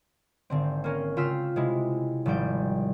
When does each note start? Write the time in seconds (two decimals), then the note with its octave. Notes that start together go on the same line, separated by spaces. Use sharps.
0.50 G#1 D3 C4
0.84 A#3 C#4 A#4
1.17 C#3 F4 F5 G5 E6 B6
1.56 C3 G#3 E4
2.26 G#1 F3 G3 G5